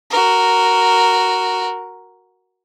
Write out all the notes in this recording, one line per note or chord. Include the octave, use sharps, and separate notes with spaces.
F#4 A#4